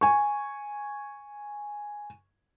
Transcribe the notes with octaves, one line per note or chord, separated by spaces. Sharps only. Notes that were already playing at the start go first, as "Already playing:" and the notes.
G#5 C#6